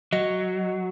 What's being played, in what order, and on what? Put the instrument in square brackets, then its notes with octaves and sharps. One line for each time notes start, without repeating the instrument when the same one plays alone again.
[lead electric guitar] F#3 [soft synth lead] D#5